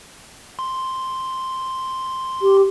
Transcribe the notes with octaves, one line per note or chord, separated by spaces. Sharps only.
C6
G4